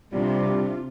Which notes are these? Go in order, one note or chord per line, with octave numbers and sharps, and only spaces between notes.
C3 G3 D4 F4